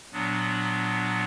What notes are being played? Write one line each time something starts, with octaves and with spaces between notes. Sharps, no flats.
A#2 F#3 B3 D4